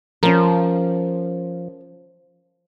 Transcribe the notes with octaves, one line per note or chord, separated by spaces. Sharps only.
F3 C#4 A#4